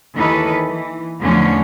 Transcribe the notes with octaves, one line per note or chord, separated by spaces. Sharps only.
D#2 D#3 E3 A4 B4
E3
E2 D3 F3 F#3 A3 C#4